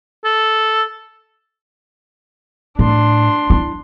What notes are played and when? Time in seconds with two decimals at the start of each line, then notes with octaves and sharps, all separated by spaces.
0.25 A4
2.79 A2 D4 C6
3.50 E4